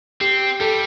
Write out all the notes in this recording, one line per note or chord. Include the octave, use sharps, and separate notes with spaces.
C4 G4
G3 A4